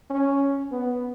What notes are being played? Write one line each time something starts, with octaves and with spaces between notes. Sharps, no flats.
C#4
B3